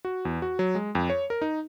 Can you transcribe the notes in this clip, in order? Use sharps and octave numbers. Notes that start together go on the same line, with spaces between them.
F#4
E2
F#4
F#3
G#3
F2
C#5
A#4
D#4